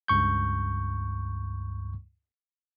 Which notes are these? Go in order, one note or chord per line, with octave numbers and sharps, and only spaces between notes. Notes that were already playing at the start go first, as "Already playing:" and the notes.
C#2 G2 C#6 G6